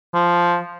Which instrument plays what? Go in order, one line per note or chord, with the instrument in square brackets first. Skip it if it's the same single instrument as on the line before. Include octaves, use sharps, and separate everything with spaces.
[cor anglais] F3